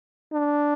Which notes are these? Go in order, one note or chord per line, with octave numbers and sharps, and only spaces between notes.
D4